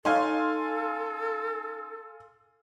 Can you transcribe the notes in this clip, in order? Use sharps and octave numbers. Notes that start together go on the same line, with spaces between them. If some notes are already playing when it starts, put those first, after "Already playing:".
C#4 D#4 A4 F5 G#5 C6